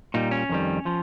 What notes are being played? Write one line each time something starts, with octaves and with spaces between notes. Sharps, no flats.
A#2 G3 D#4
C#4
F2 D#3 G3
F3